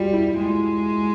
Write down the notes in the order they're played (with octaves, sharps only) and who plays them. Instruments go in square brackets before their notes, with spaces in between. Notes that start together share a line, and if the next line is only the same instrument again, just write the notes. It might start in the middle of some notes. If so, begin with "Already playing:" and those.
Already playing: [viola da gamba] G3 [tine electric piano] F4 F#4
[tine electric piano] E4
[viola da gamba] G#3 [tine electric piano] F4